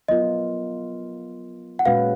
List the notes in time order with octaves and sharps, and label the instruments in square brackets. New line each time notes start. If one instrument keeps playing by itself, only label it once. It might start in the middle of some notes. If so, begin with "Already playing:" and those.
[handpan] F#3 B3 F4 A#4 [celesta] D#5
[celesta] F#5
[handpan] A#2 G#3 C#4 F#4 B4 [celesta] F5